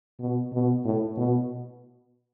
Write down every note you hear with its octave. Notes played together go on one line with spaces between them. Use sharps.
B2
B2
A2
B2